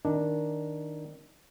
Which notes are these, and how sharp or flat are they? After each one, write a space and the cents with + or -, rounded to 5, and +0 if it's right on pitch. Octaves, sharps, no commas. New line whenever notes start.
D#3 +5 D4 +0